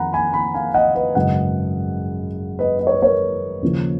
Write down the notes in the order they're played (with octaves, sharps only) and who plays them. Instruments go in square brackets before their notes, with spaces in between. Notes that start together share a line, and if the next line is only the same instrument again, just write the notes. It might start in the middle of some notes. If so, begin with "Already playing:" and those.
Already playing: [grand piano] F2 D#3 F#5 A#5 B5
G#5 B5
G#5 B5
F5 G#5
D#5 F#5
B4 D#5
G#1 F#2 C#3 D#5 F#5
B4 D#5
D#5
C#5
B4
A#4 C#5
D#2 C#3 F3